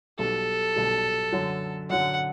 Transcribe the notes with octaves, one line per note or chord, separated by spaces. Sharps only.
B1 B2 G3 A4
B1 B2 G3
F#2 D3 F#3
F#2 D3 F#3 F#5